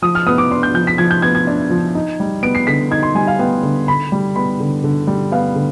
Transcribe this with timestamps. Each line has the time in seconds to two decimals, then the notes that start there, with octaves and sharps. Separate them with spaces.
0.02 F3 D#6
0.15 F6
0.26 B3 D#6
0.38 D6
0.51 D4 C6
0.63 G6
0.74 F3 G6
0.87 B6
0.98 F3 G#6
1.11 G6
1.22 B3 G#6
1.35 G#6
1.47 D4
1.70 F3
1.95 D#4
2.20 G3
2.43 B3 D7
2.55 C7
2.67 D3 B6
2.91 D#4 G#6
3.03 C6
3.15 G3 G#5
3.27 F5
3.39 B3 G5
3.63 D3
3.88 D3 B5
4.12 G3
4.36 B3 B5
4.60 D3
4.84 D3
5.07 G3
5.32 B3 F5
5.56 D3